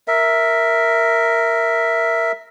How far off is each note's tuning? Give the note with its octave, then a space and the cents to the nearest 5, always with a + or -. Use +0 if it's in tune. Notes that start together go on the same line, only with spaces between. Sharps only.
A#4 -5 E5 +0